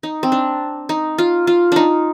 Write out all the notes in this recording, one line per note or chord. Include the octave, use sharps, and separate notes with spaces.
D#4
C4
D4
D#4
F4
F4
D4 D#4